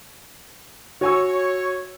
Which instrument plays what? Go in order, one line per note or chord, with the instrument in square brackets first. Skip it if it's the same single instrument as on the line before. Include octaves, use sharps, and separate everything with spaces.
[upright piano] F#4 G#5 E6 [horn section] C#5